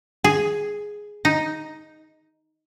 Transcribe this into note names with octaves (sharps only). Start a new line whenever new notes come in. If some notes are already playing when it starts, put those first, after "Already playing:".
G#4
D#4